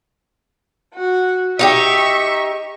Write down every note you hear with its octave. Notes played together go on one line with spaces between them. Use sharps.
F#4
D#4 F4 G4 E5 C#6